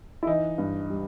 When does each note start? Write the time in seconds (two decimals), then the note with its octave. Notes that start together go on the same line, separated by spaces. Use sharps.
0.23 E4
0.26 E3 D#4
0.58 G2
0.90 G3